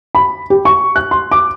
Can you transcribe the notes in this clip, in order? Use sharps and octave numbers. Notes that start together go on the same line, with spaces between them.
B5
G4
C#6
F#6
C6
D6